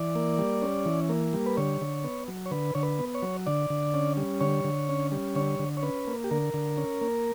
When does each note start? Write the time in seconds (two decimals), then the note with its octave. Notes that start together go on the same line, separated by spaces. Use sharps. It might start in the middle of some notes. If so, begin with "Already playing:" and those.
Already playing: E3 D5
0.15 A#3
0.38 G3
0.62 C#4
0.86 E3
1.09 A#3
1.33 G3
1.46 B4
1.57 D3 C#5
1.81 D3
2.04 B3
2.28 F#3
2.46 C#5
2.51 D3 B4
2.75 D3 C#5
2.83 B4
2.99 B3
3.15 C#5
3.22 F#3
3.46 D3 D5
3.70 D3
3.94 C#4
4.17 G3
4.41 D3 C#5
4.64 D3
4.89 C#4
5.12 G3
5.35 D3 C#5
5.59 D3
5.77 C#5
5.83 C#4 B4
6.08 A#3
6.24 G4
6.31 D3 A#4
6.54 D3
6.78 C#4
7.01 A#3